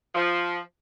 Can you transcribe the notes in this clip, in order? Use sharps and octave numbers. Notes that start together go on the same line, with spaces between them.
F3